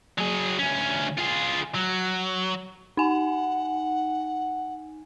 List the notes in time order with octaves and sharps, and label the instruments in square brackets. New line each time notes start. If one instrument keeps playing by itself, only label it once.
[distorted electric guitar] F#3 G#4
D2 C#4
F4 G#4
F#3
[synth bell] D#4 G#5 [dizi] F#5